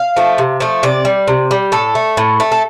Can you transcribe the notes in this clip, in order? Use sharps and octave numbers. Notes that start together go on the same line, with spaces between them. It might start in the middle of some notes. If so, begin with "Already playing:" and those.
Already playing: F5
F3 A3
C3
F3 A3
C3 D5
G3
C3
G3
A2 A4
A3
A2
A3
A4